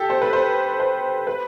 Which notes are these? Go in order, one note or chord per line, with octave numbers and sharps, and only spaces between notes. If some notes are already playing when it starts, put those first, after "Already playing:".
Already playing: G4 A4
C5
B4
C5
C5
B4